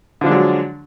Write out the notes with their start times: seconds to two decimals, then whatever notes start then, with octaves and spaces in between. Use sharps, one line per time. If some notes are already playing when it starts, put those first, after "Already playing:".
0.21 D3
0.24 F3
0.26 D4
0.29 G#3
0.31 F#3